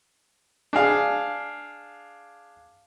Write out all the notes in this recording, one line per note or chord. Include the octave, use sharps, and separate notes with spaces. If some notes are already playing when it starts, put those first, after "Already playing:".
D4 G#4 F5